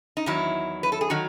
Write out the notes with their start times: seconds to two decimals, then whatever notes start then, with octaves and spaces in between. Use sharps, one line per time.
0.17 D#4
0.26 E2 D#3 F#3 E4
0.83 B4
0.92 A4
1.01 G#4
1.10 D#3 F#3 F#4